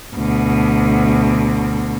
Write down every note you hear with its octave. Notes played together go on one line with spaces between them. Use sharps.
D2 B2